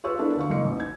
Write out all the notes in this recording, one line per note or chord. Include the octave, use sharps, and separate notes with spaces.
F4 G4 B4 C#5 C#6 E6
B3 D4 E4 A4 A#4
D2 F5 C#6
F#1 A#3 C#7
A1 D#4
G#6